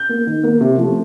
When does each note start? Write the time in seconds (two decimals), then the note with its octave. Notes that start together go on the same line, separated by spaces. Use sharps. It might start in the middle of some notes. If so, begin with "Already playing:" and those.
Already playing: G6
0.09 A#3
0.27 D#3
0.43 A#3
0.61 C3
0.78 F3 A3